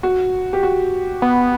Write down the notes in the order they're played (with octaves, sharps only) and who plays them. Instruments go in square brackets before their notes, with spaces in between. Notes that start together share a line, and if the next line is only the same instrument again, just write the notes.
[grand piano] F#4
G4
F#4
[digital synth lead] B3